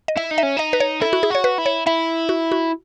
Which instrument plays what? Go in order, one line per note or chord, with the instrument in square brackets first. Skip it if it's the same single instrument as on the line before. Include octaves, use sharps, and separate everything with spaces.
[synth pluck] D#5
[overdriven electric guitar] E4 [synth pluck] E5
[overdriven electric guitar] D#4
[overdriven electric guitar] C#4 [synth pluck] E5
[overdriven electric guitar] D#4 [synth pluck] D#5
[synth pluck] B4
C#5
[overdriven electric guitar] E4 [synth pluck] A4
[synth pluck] F#4
G#4
[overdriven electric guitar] F#4 [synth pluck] C#5
[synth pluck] B4
[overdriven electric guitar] E4
[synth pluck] C#5
[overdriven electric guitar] E4 [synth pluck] E5
[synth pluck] F#4
F#4